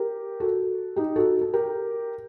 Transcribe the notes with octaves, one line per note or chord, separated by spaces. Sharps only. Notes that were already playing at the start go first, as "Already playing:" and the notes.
Already playing: G4 A#4
F#4 A4
D#4 G4
F#4 A4
A4
G4 A#4